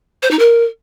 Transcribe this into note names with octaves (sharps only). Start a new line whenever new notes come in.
C5
D#4
A#4